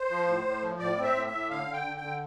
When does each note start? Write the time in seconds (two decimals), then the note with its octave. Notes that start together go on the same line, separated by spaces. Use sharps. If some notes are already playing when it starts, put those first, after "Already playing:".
Already playing: C5
0.10 F3
0.27 A2
0.45 A2
0.62 F3
0.79 A2 D5
0.97 C4
1.03 E5
1.15 A2
1.27 E5
1.32 A2
1.50 D3 F5
1.68 D3
1.73 G5
1.84 D3
1.97 G5
2.02 D3